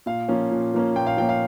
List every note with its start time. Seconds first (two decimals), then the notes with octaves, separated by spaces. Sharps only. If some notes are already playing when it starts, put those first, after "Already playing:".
0.06 A#2 F5
0.28 F3 A#3 C#4
0.51 A#2
0.74 F3 A#3 C#4
0.96 A#2 G5
1.07 F5
1.17 F3 A#3 C#4 G5
1.29 F5